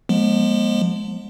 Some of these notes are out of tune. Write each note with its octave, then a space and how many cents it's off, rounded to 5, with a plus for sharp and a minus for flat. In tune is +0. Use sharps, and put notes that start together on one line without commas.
F3 +40 G#3 +0 B3 -40